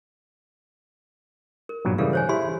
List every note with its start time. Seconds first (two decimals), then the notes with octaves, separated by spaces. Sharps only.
1.69 A#4
1.85 G2 A#2 F#3
1.98 C#3 E3 G3 A4 F5
2.13 C5 C#5 G#5
2.29 E4 G4 G#4 C6